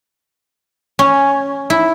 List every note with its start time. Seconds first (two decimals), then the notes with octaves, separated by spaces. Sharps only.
0.99 C#4
1.70 E4